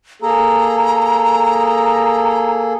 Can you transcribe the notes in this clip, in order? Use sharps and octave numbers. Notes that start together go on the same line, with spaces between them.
A#3 G#4 A4 A#5